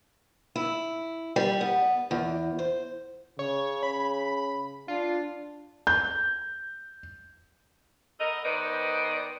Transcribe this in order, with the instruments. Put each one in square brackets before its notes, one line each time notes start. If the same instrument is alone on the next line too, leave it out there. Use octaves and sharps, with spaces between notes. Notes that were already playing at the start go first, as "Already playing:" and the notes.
[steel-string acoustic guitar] E4
G3
B3
E2
C5
[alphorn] C#3 [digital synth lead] C#5
[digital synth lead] B5
[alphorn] D4 [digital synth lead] F4
[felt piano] G6
[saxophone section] B3 A4 A#4 D#5
D#3 B3 B4 C5 D5 D#5